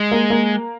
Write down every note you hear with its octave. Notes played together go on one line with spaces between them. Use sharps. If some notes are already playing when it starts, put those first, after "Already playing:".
Already playing: G#3
A#3
A#3